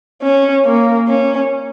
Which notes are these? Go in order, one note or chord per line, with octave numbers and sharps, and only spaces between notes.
C#4
A#3
C#4